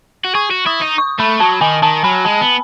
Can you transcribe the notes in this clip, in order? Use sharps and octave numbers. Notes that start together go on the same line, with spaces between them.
F#4
G#4 C#6
F#4
E4 D#6
D#4
C#6
A3 B5
F#3 A5
D#3 G#5
D#3 A5
F#3 B5
G#3 A5
B3